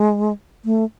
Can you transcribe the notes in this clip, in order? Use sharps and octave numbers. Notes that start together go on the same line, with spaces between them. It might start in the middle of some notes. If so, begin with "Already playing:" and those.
Already playing: G#3
A3